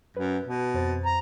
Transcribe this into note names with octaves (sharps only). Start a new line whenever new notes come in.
F#2 B4
B2
F2 C5 A6
A#5